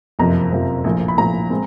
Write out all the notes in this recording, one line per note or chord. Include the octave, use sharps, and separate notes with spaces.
F#1 F2 C3 F3 A#5
F#1 F2 C3 F3
A#1 A2 F3
B5
A#1 A2 F3 A#5
G#3 C4